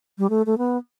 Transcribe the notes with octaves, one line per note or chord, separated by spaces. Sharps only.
G3
A3
A3
B3